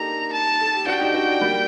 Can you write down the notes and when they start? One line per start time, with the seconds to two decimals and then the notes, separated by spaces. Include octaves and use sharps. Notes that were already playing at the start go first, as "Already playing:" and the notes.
Already playing: A#3 D4 D#4 G4 A4 A#5
0.33 A5
0.60 A4
0.73 G4
0.86 D4 F#4 G5
1.00 D#4 G4
1.14 D4 F#4
1.27 D4 F#4
1.41 G3 A#3